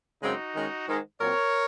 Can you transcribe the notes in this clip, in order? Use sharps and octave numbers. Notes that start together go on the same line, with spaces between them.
F#2 C#3 G#3 C4 D#4 F#4
D#3 G#3 C#4
G#2 D#3 G#3
A#2 F#3 C4 A#4 C#5